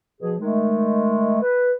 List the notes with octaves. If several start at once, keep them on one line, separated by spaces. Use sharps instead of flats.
B2 F3 G#4
D#3 G#3 A3
B4